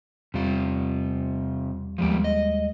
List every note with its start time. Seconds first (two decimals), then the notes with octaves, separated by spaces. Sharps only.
0.34 E2 C3 G3 F4
1.98 D#2 F3 G3 G#3 B3 G4
2.24 D#5